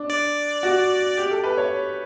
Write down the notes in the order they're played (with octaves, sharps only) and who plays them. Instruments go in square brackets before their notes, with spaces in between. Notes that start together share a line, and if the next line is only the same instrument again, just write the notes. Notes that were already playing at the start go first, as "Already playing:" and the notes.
Already playing: [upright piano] D4
[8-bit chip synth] D5
[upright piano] F#4
G4
A4
B4
C#5